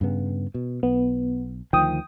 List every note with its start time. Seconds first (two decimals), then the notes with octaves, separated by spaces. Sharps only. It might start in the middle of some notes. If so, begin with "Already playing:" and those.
0.01 G2 C#3 B3
0.54 B2
0.83 B1 B3
1.73 D2 D#3 F3 G5 D#6